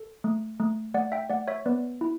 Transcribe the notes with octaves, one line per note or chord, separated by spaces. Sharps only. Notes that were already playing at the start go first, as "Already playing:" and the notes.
Already playing: A4
A3
A3
A3 D5 F#5
E5 G5
A3 D5 F#5
C#5 E5
B3 B4 D5
E4